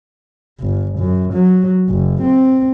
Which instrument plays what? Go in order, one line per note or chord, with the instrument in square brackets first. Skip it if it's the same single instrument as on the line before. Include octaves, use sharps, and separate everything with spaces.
[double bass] G1
F#2
F#3
F#1
C4